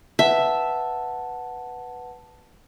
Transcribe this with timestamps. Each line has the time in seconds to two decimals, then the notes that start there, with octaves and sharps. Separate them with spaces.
0.19 B4 E5 F#5 A5